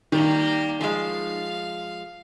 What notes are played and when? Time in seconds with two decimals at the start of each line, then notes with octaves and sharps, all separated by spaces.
0.12 D#3 G3 A#3 G4
0.81 F3 G#3 F5